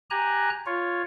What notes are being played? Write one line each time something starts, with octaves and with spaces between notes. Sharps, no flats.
G4 G#5 A#5 F#6
F4 C#5